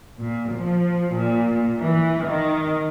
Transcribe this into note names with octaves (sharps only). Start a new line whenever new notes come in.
A#2
F3
A#2
E3
D#3